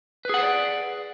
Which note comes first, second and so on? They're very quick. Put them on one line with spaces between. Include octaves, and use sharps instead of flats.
B4 G#4 F#5 C5 D5